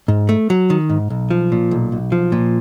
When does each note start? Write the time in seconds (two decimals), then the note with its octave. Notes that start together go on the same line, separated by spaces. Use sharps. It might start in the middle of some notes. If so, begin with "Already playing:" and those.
0.08 G#2
0.29 A3
0.50 F#3
0.70 D#3
0.89 G#2
1.10 B1
1.30 F3
1.52 A#2
1.71 B1
1.92 B1
2.12 F3
2.32 A#2